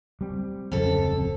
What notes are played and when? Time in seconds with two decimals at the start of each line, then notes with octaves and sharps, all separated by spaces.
0.21 G3 C4
0.72 D1 F2 C#3 A4